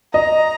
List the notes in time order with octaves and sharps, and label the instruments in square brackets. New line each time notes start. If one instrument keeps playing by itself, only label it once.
[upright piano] D#5 [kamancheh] A#5